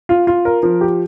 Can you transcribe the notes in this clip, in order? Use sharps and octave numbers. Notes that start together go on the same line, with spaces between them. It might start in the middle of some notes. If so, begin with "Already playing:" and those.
F4
F4
A#4
F3
G4